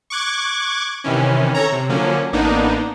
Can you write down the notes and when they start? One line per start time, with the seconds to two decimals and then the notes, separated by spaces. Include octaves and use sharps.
0.10 C#6 D6 F#6 G#6
1.04 C3 D#3 E3 C#4
1.55 A4 C#5 A#5
1.72 C3
1.89 D3 F3 F#3 A#3 C#4
2.33 A1 A#3 B3 D4 D#4